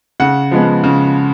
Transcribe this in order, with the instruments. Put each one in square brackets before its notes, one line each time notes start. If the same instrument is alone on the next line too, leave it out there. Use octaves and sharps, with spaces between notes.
[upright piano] C#3 F#5
F3 G#3 B3
C#3